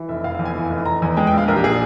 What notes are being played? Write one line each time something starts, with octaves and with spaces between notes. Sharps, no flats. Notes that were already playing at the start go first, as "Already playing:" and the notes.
Already playing: E3
F1 E5
F1 F5
F5
E2
G#5
E3
F1
F1 A#5
E2 G#5
G#3 G5
G5
A#1
F5
A#1 A#4
G4
A#2 G#4